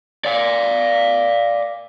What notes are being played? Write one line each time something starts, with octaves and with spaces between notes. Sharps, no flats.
D5 F5